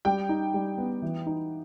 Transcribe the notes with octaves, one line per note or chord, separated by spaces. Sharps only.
G3 G5
D#4
G3
B3
E3
D#4